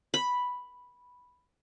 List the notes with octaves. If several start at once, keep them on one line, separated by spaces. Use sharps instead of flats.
B5